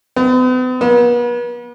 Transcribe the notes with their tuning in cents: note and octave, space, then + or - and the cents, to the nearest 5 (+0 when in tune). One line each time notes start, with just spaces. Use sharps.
B3 +45
B3 -40